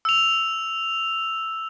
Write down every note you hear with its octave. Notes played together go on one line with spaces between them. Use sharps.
E6 F7